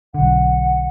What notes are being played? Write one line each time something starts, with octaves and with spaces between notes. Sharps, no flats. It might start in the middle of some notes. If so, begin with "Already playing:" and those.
B1 D3 F#5